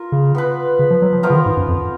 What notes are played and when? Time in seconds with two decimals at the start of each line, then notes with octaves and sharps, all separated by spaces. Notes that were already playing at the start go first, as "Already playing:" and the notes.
Already playing: F4 A#4
0.12 C#3
0.35 B3 F4 B4
0.79 C#3
0.91 F3
1.02 F#3
1.13 F3
1.23 F3 B3 F4 A#4
1.30 C#3
1.35 D#3
1.46 G#2
1.57 F#2
1.68 F2